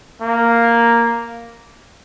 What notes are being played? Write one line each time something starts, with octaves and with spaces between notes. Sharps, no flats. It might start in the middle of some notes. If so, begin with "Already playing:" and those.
A#3